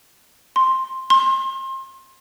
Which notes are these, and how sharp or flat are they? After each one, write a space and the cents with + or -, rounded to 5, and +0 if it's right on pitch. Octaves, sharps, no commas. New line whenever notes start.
C6 +5
C6 +30